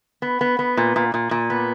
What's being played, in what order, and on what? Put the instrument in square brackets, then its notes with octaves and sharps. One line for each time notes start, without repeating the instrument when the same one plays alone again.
[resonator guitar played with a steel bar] B3
B3
B3
A#2
A#2
A#2
A#2
B3